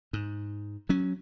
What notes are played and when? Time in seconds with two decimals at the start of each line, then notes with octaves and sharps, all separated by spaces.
0.13 G#2
0.89 F#3 C#4